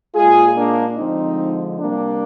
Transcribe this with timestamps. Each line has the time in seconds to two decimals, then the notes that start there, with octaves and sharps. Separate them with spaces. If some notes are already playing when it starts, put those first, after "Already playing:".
0.14 A#2 G#3 F4 G#4
0.55 A#3 D4
0.97 D3 F3 G#3 C4 D#4
1.79 C3 G3 A#3 D4